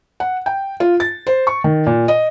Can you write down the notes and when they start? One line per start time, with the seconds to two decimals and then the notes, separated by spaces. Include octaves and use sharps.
0.20 F#5
0.46 G5
0.80 F4
1.00 A6
1.27 C5
1.47 C#6
1.64 D#3
1.86 A#2
2.08 D#5